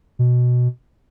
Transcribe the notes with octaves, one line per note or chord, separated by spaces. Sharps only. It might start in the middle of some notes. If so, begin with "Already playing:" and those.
B2